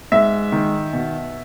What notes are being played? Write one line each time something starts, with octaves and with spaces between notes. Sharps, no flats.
G#2 E5
D#3
B2